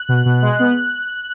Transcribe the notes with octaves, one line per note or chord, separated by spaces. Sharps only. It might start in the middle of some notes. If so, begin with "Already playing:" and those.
Already playing: F#6
B2
B2
G#3
B3